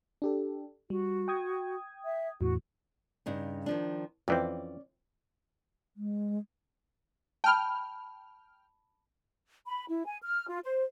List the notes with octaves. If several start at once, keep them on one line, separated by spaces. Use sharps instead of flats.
D4 G4 A4
G3 F#4
G5 D#6 G#6
E5
E2 A2 E3 F#4
G2 C#3 D#4
D#3 F3 D4
F2 E3 C4 C#4 D5
G#3
G5 A5 B5 F6
B5
E4
G#5
F6
F4
C5